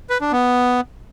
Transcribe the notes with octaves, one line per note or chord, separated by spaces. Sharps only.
B4
D4
B3